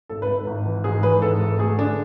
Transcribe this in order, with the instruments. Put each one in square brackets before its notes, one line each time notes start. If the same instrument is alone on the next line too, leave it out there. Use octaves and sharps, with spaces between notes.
[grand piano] G#1 [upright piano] A4
[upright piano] B4
[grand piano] G#1
G#1
E3
[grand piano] G#2 [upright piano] G#4
[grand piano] E3 [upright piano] B4
[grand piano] G#2 [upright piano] A4
[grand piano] G#1
[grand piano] A3 [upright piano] G#4
[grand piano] D3 [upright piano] D4